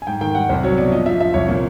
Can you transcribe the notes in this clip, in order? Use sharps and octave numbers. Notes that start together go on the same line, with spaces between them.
G#5
G#2 G5
D#3 G5
G3 F#5
C2 C5
F#3 C#5
B2 D5
F3 D#5
F3 E5
F3 E5
C2 C#5
A#2